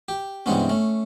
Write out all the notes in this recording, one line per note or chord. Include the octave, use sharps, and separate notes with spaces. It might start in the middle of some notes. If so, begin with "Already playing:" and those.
G4
G2 C3 E3 G#3 B3 C#4
A3 C#4